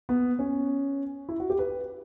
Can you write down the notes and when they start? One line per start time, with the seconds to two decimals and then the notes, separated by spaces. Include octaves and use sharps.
0.09 B3
0.39 C#4
1.29 E4
1.40 F#4
1.50 G4
1.59 B4